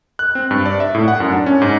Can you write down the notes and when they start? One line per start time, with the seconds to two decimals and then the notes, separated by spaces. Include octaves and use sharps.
0.19 F#6
0.35 C4
0.51 G2
0.66 D5
0.80 E5
0.95 A2
1.08 F#5
1.20 F#2
1.32 D4
1.46 C#4
1.62 G#2